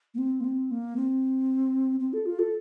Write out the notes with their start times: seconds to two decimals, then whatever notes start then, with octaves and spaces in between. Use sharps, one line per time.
0.14 A#3
0.18 C4
0.40 A#3
0.44 C4
0.71 A#3
0.96 C4
2.00 C4
2.13 A4
2.26 F4
2.39 A4